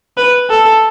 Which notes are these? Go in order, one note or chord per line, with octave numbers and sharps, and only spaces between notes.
B4
A4